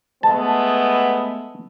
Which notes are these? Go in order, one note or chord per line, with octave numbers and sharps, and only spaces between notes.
G#3 A3 B3 A5